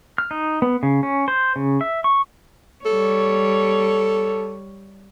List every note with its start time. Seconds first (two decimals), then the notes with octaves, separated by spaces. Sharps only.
0.18 F6
0.31 D#4
0.62 B3
0.83 C#3
1.03 C#4
1.28 C5
1.56 C#3
1.81 E5
2.04 C#6
2.85 G3 A4 C#5